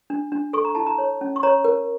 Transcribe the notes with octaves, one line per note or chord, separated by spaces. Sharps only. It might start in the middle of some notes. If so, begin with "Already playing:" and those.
D4
D4
A4 C#6
A#5
E4 A5
A#5
C#5
C#4
C#6
C#5 A#5
A#4